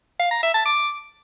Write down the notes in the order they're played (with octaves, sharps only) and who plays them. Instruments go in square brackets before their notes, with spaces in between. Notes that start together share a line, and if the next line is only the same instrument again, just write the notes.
[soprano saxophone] F5
A#5
E5
A5
D6